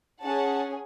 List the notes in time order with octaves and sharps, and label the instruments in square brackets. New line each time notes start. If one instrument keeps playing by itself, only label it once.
[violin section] C#4 G#4 F#5 A5